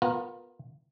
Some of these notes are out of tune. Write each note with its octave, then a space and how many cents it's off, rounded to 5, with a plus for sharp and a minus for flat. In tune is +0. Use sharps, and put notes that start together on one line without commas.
B3 +0 F4 +30 A#4 +0